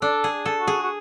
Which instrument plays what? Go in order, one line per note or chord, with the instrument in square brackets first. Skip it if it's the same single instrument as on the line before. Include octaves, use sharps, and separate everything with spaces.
[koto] D4 [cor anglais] A4
[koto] G#4
A4
[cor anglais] F#4
[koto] G#4
[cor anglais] F#4